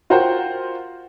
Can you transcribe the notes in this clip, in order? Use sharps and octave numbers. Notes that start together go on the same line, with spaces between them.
F4 F#4 A#4 C5 F#5 G5